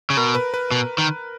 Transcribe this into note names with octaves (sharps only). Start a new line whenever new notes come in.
C#3
B2 A#4
B4
B4
B2
D#3